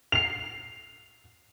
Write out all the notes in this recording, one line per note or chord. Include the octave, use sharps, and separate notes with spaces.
C7 F7